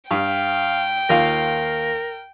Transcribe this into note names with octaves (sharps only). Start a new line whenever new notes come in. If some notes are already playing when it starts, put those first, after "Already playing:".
G2 F5 G5
D#2 F4 A#4 F5